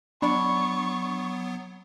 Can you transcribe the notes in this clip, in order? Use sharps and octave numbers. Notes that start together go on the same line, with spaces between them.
F#3 B3 D4 B5 C#6